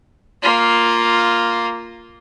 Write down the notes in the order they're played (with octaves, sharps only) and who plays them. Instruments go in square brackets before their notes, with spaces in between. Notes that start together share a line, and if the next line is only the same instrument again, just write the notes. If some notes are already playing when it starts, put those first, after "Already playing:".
[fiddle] A#3 F4